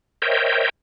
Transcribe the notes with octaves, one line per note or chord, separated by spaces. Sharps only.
A#4 C5 C#5 D#5 E5 G5